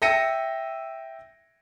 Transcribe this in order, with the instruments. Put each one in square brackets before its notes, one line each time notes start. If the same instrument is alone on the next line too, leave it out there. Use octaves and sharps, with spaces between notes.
[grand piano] E5 G5 E6 A#6 C#7 D#7